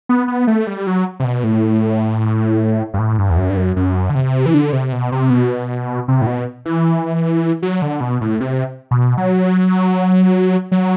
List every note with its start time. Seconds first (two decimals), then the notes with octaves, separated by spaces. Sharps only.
0.09 B3
0.28 B3
0.47 A3
0.67 G3
0.87 F#3
1.20 C3
1.24 B2
1.44 A2
2.94 G2
2.99 A2
3.18 G2
3.30 E2
3.37 F#2
3.50 G2
3.57 F#2
3.76 F#2
4.10 D3
4.15 C3
4.46 E3
4.54 D3
4.73 C3
4.92 B2
5.12 C3
5.30 B2
6.08 C3
6.22 A2
6.27 B2
6.65 E3
7.62 F#3
7.82 D3
8.01 B2
8.21 A2
8.40 C3
8.91 B2
9.17 F#3
10.72 F#3